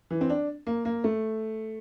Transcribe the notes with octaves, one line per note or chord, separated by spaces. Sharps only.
E3
C4
D4
A#3
A#3
A3